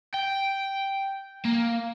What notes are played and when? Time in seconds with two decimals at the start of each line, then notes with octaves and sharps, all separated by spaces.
0.14 G5
1.45 A#3